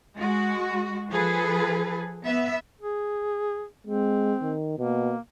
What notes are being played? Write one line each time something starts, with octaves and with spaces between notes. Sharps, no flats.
G#3 F#4
F3 G#4 A4 B4
B3 E5
G#4
G#3 C4
D#3
B2 A#3